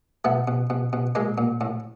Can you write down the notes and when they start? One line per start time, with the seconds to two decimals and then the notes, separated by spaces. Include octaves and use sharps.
0.25 B2 A3 B3
0.48 B2
0.70 B2
0.93 B2
1.15 A#2 G#3 A#3
1.38 A#2
1.61 A2